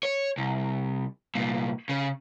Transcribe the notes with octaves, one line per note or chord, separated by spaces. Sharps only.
C#5
C2
C2 A#2
C#3